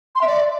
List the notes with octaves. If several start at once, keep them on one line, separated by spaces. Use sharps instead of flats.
C6
E5
D5